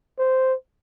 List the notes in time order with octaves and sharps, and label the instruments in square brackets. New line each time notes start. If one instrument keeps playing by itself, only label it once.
[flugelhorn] C5